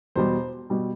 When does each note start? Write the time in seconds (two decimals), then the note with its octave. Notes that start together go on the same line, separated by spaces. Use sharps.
0.15 E2 B2 G3 C5
0.70 B2 G3